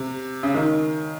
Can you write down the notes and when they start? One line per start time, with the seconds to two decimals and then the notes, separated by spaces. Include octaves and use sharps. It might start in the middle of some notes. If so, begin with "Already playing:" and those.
Already playing: C3
0.43 C#3
0.55 D#3